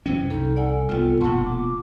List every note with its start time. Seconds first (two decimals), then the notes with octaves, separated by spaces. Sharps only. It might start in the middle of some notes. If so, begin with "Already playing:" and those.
0.06 F#2 C3 E3 G3 C#4
0.30 C2 D#4 A4
0.56 A4 D5 F#5 G#5
0.89 C2 G3 B3 F4 G5
1.21 E1 A#2 F#5 A5 C6 C#6
1.44 D6